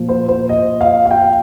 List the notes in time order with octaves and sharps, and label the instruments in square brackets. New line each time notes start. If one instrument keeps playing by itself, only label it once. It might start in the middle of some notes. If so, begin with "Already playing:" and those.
Already playing: [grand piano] A#2 F3
C5
C5
D#5
F5
F5
G5